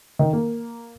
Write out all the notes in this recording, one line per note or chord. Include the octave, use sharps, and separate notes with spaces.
D#3
A#3